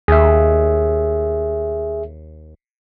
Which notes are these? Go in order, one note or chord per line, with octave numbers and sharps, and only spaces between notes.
D#2 G#4 E5